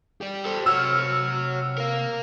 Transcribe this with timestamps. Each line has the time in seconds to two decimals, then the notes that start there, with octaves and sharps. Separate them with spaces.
0.21 G4 D5
0.45 A4 C5
0.66 C3 F#4 C#5 F#5 E6 F6
1.78 A#4 F5